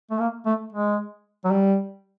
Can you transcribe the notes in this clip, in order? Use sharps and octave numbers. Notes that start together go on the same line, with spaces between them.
A3
A#3
A3
G#3
F#3
G3